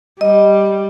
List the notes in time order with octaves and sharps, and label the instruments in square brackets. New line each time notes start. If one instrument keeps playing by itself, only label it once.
[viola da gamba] G3 [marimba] D#5